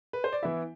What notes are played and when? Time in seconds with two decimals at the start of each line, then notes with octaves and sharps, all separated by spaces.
0.13 B4
0.24 C5
0.33 D5
0.43 E3 B3 E4 E5